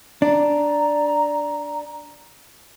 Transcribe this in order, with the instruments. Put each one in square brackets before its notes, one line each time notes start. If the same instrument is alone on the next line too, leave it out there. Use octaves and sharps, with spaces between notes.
[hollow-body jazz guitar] D4 [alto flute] A#5